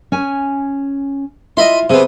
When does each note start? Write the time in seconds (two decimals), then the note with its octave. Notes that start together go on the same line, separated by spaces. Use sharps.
0.12 C#4 G#5
1.57 E4 F4 D#5 E5 B5 C6
1.90 C3 B3 G#4